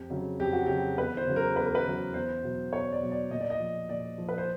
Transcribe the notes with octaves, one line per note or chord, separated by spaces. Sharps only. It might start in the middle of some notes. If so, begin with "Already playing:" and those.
Already playing: F2 G4
C#3 F#3
F2 G4
F#4
C#3 F#3 G4
E2 B4
C5
C#3 F#3
A#4
E2 B4
A#4
B4
C#3 F#3
E2 C5
B2 F#3
E2 C#5
D5
B2 F#3
D5
A#2 D#5
D5
D#5
F3
A#2 D5
F3
B4
C5